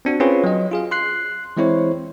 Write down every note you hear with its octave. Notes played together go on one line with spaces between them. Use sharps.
C4 D4 F#4
C4 C#4 F4 G#4 B4 C#5
F#3 D#5
F4 G#4 F5
C6 F#6 C7
E3 G#3 C4 E4 C5 C#5